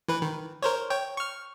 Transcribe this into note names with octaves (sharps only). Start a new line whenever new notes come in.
E3 B4
D#3
A#4 C5 C#5
C#5 G5
C#6 F6